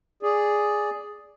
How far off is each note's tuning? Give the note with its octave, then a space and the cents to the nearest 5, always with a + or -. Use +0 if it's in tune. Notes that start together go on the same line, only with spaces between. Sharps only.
G#4 +0 D5 -5